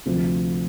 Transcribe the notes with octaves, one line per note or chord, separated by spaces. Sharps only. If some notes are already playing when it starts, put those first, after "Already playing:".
D2 C3 F3